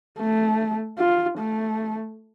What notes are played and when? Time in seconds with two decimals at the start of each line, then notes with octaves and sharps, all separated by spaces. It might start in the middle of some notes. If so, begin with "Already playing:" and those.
0.18 A3
0.98 F4
1.38 A3